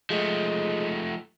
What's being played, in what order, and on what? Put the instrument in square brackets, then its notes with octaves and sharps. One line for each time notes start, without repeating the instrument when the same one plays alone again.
[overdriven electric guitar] F3 A3 [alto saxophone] G#3